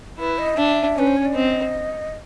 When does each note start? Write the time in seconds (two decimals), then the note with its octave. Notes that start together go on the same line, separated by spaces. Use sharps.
0.19 E4 B4
0.38 D#5
0.57 D4 E5
0.96 C#4 B4
1.07 C5
1.17 C#5
1.25 D5
1.35 C4 D#5